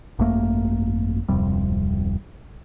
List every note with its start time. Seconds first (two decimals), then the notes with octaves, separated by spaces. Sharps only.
0.19 G#1 F#2 A3 A#3
1.28 D1 F2 C3 G3